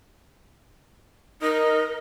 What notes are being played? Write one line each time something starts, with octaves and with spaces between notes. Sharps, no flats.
D#4 A#4